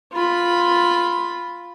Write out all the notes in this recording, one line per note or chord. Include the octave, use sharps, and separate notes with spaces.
F4 B5